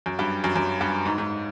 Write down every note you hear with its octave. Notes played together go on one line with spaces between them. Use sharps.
F#2
G2
F#2
F#2
G2
G#2
G#2